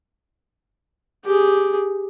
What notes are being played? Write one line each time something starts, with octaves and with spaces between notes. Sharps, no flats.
G4 G#4